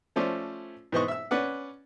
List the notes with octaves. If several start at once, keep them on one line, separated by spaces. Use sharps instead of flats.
F3 A3 C#4 C5 D5
G#2 E3 B3 C5 D#5 C#6
E5 E6
C#4 B4 D5 F#5